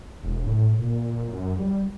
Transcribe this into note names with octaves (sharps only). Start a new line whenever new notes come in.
E1
A2
A#2
F#2
G3